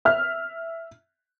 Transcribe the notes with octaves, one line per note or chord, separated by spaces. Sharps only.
E5 F6